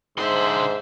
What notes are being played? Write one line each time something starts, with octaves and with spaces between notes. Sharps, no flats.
G#2 D3 C5 E5 C6